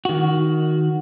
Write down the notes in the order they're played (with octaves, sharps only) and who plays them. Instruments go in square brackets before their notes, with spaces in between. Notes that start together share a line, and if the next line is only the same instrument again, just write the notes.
[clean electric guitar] D#3 F#4